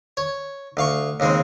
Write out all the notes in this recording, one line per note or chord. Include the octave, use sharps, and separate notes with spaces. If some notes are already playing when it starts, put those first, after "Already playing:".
C#5
D2 F5 C#6
D#2 C#3 G#3 C4